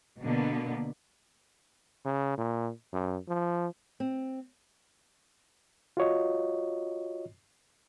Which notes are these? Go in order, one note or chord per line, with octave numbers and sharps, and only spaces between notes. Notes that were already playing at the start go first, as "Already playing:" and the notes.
B2 D3 A#3 B3
C#3
A#2
F#2
F3
C4
F4 F#4 C#5 D#5